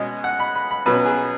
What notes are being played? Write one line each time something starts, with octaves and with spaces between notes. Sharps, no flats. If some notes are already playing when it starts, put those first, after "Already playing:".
Already playing: B2 G#3 C#4 D#5
F#5
B5
B5
B5
B2 F#3 C#4 B4
G#4